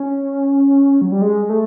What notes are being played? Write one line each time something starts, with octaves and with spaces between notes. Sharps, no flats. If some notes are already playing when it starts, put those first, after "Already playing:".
Already playing: C#4
F#3
G3
G#3
A3